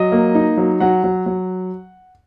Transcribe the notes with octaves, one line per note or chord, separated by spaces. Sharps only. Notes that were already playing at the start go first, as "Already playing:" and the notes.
Already playing: F#3 D#5
A#3
D#4
F#3
F#3 F#5
F#3
F#3